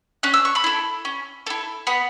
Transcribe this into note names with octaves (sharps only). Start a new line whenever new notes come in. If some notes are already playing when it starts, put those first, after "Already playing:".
C#4 F#6
E6
C#6
B5 E6
E4 A4
C#4
E4 A4
B3 F#5 B5